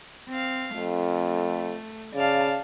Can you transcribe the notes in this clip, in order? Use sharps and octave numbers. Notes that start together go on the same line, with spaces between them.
C4 F5
F2 A3
C#3 D5 F5 A5